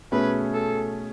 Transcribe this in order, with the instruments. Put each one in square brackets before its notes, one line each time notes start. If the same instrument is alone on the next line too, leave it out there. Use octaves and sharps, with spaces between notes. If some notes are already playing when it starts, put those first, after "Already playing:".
[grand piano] B2 A3 C#4 G#4 [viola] B4
[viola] A4